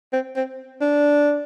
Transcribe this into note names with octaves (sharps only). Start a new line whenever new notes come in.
C4
C4
D4